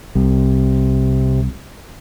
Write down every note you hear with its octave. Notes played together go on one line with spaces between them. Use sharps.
C2 C3